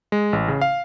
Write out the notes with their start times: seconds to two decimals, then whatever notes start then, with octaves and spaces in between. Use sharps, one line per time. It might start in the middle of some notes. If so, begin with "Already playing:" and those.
0.12 G#3
0.33 A1
0.48 C#3
0.61 F5